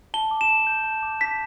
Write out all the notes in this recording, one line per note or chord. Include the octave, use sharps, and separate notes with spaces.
A5 G7
D6
E7
A5
G6
A5
D6
A5 B6